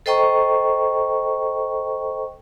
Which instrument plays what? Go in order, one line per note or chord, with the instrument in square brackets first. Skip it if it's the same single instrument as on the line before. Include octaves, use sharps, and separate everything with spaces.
[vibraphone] A4 C5 D#5 G5 A#5 C#6